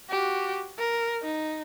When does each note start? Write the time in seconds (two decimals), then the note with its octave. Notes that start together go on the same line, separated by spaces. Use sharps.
0.10 F#4 G4
0.78 A#4
1.23 D#4